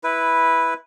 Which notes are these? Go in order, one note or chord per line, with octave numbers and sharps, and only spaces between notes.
E4 B4